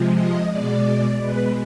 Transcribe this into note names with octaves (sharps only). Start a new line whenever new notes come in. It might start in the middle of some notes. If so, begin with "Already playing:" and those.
Already playing: C3 F3 G#3
D#5
B2 G#3 D5
B2 G#3 B4